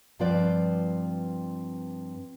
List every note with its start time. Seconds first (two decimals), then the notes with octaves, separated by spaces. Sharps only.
0.19 G2 F3 C4 F4 B4 D5